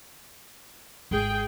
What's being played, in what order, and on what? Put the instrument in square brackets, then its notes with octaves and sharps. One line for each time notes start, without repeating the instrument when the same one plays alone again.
[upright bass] G#1 [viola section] G#4 G5